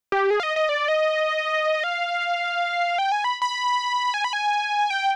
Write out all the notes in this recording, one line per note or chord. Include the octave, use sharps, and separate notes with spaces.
G4
G#4
F5
D#5
D#5
D5
D#5
F5
G5
G#5
B5
B5
G#5
B5
G#5
G5